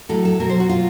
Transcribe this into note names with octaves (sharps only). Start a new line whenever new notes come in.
A2 F#3 A4
A4
B2 F#3 A#4
C5
F#4
B2 F#3 F4